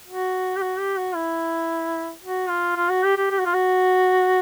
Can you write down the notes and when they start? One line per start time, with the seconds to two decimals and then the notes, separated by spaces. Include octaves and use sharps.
0.08 F#4
0.57 G4
0.61 F#4
0.79 G4
0.97 F#4
1.15 E4
2.23 F#4
2.49 F4
2.76 F4
2.90 F#4
3.04 G4
3.17 G4
3.31 G4
3.38 F#4
3.46 F4
3.54 F#4